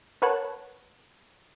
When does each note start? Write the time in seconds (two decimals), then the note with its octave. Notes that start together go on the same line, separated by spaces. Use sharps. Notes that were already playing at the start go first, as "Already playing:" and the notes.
0.22 A#4 B4 C#5 F#5 A5 F#6